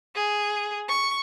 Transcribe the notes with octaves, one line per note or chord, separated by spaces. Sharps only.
G#4
C#6